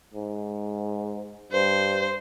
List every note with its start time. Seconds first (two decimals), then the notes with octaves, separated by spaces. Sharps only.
0.14 G#2
1.52 G2 C5